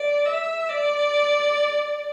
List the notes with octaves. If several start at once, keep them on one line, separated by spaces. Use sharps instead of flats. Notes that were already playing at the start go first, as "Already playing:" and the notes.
Already playing: D5
E5
D5